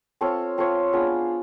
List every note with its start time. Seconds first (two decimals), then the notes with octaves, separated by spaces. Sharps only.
0.21 C4 F4 A4 C#5
0.58 C4 F4 A4 C#5
0.93 B3 D4 F4 G#4